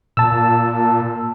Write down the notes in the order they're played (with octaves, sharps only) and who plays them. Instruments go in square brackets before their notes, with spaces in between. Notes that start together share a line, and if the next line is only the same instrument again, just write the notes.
[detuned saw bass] A#2 [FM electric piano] A5 E6